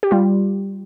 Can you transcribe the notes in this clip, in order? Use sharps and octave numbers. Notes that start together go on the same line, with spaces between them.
G4
G3 F4